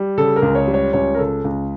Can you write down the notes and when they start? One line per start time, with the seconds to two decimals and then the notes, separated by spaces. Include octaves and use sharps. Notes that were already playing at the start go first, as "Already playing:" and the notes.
Already playing: G3
0.18 C#3 A4
0.36 A#4
0.42 C#2
0.55 C#5
0.68 G3
0.74 C#5
0.93 C#2 C#5
1.15 A#4
1.18 C#3 A4
1.44 C#2